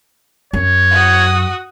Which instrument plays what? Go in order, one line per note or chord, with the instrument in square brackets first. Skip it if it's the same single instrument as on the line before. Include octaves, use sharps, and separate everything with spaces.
[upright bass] F#2 [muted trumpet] C#5
[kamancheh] F#4 D#6